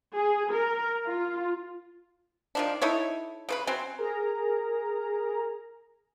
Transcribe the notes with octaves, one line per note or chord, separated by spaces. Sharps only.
G#4
A#4
F4
D#3 F3 D4
D#4 E4 A4 C#5
C#3 B4 B5
F#3 C4 C#4
G#4 A#4 A#5